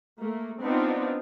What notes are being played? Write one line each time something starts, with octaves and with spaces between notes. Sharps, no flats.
A3 A#3
B3 C4 D4 D#4 F4